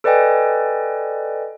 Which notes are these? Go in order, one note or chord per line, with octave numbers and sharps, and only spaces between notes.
A4 B4 D5 D#5 G5 G#5